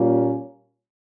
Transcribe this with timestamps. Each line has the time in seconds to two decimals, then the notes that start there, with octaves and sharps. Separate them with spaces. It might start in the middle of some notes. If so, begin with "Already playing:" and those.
Already playing: A#2 G3 A#3 C#4 F4